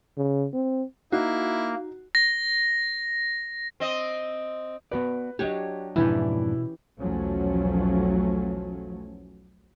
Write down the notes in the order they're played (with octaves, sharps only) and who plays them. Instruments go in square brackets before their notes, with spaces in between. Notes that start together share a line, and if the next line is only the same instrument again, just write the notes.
[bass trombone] C#3
C4
[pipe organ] A#3 [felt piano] D#4 [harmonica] E4 [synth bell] F#4
[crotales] A#6
[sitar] C4 D#5
[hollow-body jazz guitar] B3 F#4 D5 [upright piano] B4
[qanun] F#3 D4 C#5 [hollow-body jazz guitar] G4 [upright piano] D#5 G5
[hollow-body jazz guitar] F2 G#2 D4 [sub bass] B2 [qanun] E3 C#4 G4 [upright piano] E4
[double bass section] B1 E2 F3 F#3 A3 C#4